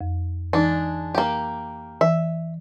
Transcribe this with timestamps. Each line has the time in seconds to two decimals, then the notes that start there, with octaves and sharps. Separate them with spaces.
0.01 F2
0.53 E3 G#3 D4 D#4
1.15 A#3 G4
2.01 E3 E5